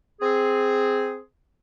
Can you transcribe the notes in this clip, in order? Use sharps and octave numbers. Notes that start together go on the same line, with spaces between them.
C4 G#4